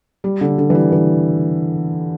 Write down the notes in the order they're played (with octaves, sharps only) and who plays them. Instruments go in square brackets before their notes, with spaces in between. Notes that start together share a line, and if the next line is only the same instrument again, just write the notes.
[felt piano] G3
D3
D3
E3
G3
E3